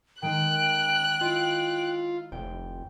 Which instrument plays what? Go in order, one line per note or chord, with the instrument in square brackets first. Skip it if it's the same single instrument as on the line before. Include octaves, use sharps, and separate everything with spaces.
[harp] D#3 G#3 D#4 [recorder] G5 [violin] F#6
[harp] E4 D#5 [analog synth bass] F4
[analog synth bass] F1 [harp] G5